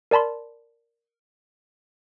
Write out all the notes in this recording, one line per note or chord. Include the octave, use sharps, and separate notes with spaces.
A#4 D5 A5 B5 C6